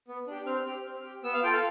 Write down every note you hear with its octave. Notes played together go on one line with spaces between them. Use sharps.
B3
D4 G4
C4 F6
G4
C4
G4
B3 E6
F5
F4 A4 G5
F5